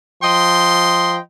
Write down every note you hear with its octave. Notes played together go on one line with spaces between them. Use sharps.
F3 D#5 G5 C6